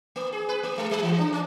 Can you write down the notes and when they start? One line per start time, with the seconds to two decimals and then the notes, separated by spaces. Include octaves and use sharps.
0.16 A#3
0.32 G#4
0.49 B4
0.63 A#3
0.78 G#3
0.91 G3
1.03 E3
1.18 D4
1.33 C#4